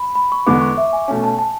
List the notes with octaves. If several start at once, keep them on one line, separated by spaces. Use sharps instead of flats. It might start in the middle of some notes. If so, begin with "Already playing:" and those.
Already playing: B5
B5
C#6
E2 D3 G#3 B3 D6
C#6
E5
G#5
B2 A3 C#4 G#5
A5
A5